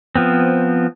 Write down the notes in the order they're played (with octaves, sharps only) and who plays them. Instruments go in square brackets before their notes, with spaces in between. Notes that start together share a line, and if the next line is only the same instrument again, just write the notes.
[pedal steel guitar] F3 B3 C4